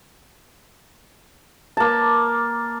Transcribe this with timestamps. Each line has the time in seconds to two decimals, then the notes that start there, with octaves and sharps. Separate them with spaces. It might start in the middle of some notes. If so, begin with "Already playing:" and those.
1.77 A#3 A5